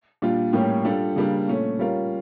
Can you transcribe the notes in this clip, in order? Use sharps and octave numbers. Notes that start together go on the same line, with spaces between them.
A#2 G3 D4 F4
A2 G3 A#3 C#4 G4
G3 D4 F4 A4
C#3 G3 A#3 D4
A#2 A3 C#4
G3 C#4 F4 A#4